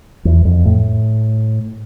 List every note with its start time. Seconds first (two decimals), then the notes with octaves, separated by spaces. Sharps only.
0.25 E2
0.45 F2
0.66 A2